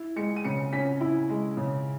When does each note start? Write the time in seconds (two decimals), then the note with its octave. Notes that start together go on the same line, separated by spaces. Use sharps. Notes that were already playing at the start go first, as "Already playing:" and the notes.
Already playing: E4
0.16 G#3 C#7
0.36 D#7
0.45 C#3 C#7
0.73 C#4 B6
1.01 E4
1.29 G#3
1.57 C#3